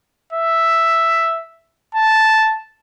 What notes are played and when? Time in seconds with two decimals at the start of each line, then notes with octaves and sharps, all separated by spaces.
0.33 E5
1.95 A5